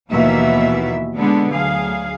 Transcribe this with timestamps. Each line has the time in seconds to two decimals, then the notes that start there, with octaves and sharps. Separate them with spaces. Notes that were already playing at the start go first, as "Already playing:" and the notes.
0.10 D#2 B2 E3 F3 A#3 E5
1.18 D3 G#3 B3 D4
1.52 D2 F#3 G#4 F5